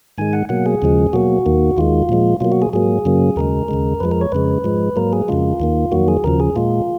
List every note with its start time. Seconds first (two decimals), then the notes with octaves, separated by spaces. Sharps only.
0.18 G#2 D#3 G#3 G#5
0.33 F#5
0.49 B2 F#3 A#3 F#5
0.66 G#4
0.82 D#2 C#3 F3 G#3
1.13 B2 F#3 A#3 F#4
1.46 D#2 D#3 A#3
1.77 D#2 D#3 G#3 F4
2.09 A#2 F3 G#3
2.40 B2 F#3 A#3 F4
2.52 F#4
2.62 G#4
2.73 G#2 F#3 A#3 G#4
3.05 F#2 C#3 F#3 A#3
3.36 D#2 C#3 G#3 A#4
3.68 D#2 C#3 G#3
4.00 F2 F3 G#3 B4
4.11 A#4
4.21 C#5
4.32 F2 C#3 G#3 B4
4.64 G#2 F3 G#3
4.96 G#2 F#3 A#3 A#4
5.13 G#4
5.28 F2 C#3 G#3 F4
5.60 D#2 D#3 A#3
5.92 F2 D#3 F#3 A#3 F#4
6.08 G#4
6.24 D#2 C#3 F3 A#4
6.40 G#4
6.56 A#2 G#3 F4